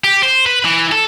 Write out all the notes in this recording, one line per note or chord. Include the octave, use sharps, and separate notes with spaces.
G4
C5
B4
E3
A4